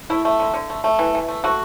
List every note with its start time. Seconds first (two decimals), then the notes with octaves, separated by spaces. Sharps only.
0.10 A3 E4
0.25 A3
0.39 D3
0.54 D3
0.70 A3
0.84 A3
0.99 E3
1.15 E3
1.28 A3
1.44 A3 F#4